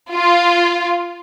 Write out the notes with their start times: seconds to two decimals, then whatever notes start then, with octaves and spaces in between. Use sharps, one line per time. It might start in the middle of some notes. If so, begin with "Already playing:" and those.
0.13 F4